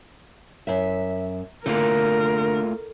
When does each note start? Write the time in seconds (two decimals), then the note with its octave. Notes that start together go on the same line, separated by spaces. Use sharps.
0.67 F#2 E5
1.66 D3 A3 A#3 F4 A#4